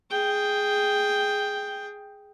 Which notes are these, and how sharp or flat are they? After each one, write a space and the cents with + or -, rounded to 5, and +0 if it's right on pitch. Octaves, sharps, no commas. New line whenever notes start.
G#4 +0 G5 +5